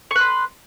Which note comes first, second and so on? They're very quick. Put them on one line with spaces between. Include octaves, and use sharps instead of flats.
C#6 B4 C6